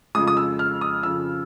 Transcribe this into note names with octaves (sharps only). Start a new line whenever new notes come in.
F2 C#3 F3 G#3 D#6
D#6
E6
F6
D#6
F2 C#3 F3 E6